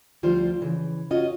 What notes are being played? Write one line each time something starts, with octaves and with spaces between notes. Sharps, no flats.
D2 F3 G3 F4 C5
C#3 E3
C#4 F4 F#4 D#5